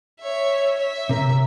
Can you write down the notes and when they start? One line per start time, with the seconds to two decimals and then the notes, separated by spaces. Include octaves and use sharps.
0.21 C#5 E5
0.77 E5
1.09 C3 A#4